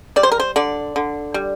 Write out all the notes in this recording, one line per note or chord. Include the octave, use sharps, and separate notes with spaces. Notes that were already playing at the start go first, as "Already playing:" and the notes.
G3 D5
C5
A#4
C5
D3 D5
D3
G3